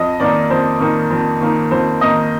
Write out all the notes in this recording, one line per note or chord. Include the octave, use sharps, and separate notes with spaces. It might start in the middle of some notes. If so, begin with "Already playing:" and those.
Already playing: F2 D#5
D#3 A#3 D#4 D5
F2 C5
D#3 A#3 D#4
F2
D#3 A#3 D#4
F2 C5
D#3 A#3 D#4 D#5